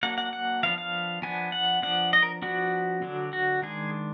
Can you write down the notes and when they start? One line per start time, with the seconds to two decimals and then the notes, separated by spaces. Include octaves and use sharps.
0.03 F#3 A#3 D4 F#5
0.18 F#5
0.33 F#5
0.63 F3 B3 D4 F5
0.78 F5
1.22 F3 B3 D4 G#5
1.52 F#5
1.82 F3 B3 D4 F#5
2.13 D#5
2.22 A#4
2.42 F3 B3 D4 F#4
3.02 D3 F#3 D4
3.33 F#4
3.62 D#3 G#3 D4 G#4